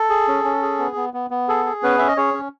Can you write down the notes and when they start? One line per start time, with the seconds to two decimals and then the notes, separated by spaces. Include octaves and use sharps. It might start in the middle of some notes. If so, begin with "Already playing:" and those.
Already playing: A4
0.10 G#4
0.28 C#4
0.44 C#4
0.62 G#4
0.79 B3
0.96 B3
1.14 B3
1.30 B3
1.48 G#4 A4
1.66 G#4
1.83 B3 C#4 B4
1.99 C#4 E5
2.08 D#5
2.17 C#4 G#4 C#5
2.34 C#4